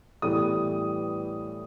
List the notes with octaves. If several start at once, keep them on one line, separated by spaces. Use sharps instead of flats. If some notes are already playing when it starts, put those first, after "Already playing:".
A2 E3 G3 B3 D#6